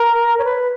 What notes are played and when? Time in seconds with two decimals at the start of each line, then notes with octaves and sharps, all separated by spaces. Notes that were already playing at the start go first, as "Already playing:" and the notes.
Already playing: A#4
0.39 C#5
0.44 B4